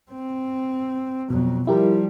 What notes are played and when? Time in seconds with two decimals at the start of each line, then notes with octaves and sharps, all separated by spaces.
0.11 C4
1.30 F2 B2 F#3
1.67 F3 G3 E4 G4 A#4